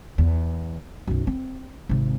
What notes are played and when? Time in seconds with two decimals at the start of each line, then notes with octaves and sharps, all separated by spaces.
0.18 E2
1.07 B1 F#2
1.27 C4
1.89 G#1 C3